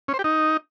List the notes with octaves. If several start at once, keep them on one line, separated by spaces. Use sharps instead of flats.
C#4
C5
G4
D#4